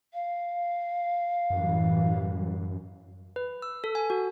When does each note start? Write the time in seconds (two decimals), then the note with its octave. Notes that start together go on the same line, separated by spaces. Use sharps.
0.14 F5
1.50 F#2 A2 E3 G3
3.36 B4
3.62 E6
3.84 A4
3.95 G#5
4.10 F#4